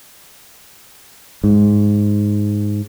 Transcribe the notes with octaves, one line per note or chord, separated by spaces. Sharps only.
G#2